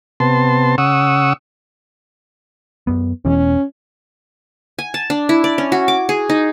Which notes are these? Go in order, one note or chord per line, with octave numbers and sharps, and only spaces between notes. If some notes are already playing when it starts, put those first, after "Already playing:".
C3 B3 A5 C6
C#3 F#5 C#6 D#6 E6
F#2 B3
E1 B2 E3 C#4
G#5
A5
D4
E4
D5
C#4
F#4
D6
G#4
D#4